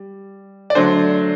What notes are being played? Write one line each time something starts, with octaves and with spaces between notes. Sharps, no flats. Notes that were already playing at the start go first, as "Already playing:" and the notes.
Already playing: G3
D5
D3 F#3 A3 D4 C5